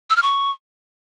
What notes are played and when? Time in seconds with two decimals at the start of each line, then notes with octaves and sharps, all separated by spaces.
0.10 E6
0.16 F6
0.22 C#6